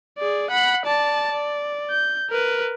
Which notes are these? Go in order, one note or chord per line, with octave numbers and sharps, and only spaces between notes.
G#4 D5
F#5 B5
D5 A5
D5
G6
A#4 B4